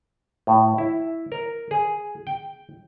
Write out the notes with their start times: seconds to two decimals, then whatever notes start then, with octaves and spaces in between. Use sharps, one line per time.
0.47 A2
0.78 E4
1.32 A#4
1.71 G#4
2.27 G5